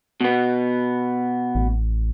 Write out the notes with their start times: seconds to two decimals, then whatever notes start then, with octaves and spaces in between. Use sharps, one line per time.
0.21 B2 B3
1.55 A1